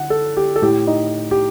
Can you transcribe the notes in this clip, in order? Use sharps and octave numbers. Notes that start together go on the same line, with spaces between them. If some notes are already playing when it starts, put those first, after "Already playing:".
Already playing: D3 F#5
A4
G4
A4
A2 G4
D#4
G4